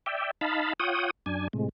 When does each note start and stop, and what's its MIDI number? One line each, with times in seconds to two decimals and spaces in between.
0.06 0.31 74
0.06 0.31 76
0.06 0.31 79
0.41 0.73 63
0.41 0.73 77
0.41 0.73 81
0.41 0.73 83
0.80 1.11 65
0.80 1.11 73
0.80 1.11 78
0.80 1.11 79
0.80 1.11 87
1.26 1.48 42
1.26 1.48 62
1.26 1.48 80
1.53 1.69 45
1.53 1.69 48
1.53 1.69 56